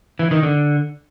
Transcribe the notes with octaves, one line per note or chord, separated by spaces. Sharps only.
E3
D#3
D3